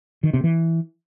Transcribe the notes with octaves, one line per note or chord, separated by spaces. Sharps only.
D#3
C3
E3